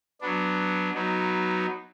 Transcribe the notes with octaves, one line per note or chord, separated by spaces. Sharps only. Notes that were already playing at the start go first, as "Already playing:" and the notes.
F#3 B3 D4
F#3 B3 D#4